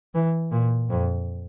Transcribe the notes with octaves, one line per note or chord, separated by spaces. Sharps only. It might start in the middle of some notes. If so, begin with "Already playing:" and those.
E3
A#2
F2